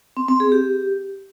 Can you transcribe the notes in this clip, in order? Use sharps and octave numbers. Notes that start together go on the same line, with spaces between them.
C4
C4
G#4
G4